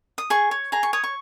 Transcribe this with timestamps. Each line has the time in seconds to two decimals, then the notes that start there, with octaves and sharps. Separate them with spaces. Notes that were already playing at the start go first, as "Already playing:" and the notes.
0.18 D#6
0.30 G#4 C#6
0.51 C#5
0.72 G#4 A#5
0.83 C#6
0.93 C#5 D#6
1.04 C#6